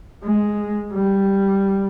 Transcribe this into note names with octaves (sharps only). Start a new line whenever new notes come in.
G#3
G3